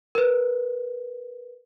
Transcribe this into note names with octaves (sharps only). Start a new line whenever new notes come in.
A#4 B4